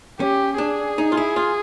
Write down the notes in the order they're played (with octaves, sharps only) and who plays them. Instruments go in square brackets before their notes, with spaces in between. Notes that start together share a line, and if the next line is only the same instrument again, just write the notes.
[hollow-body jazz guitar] C#4 [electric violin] G4
[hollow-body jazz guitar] D4 [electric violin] G#4
[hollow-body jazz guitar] D#4
F4
E4
F4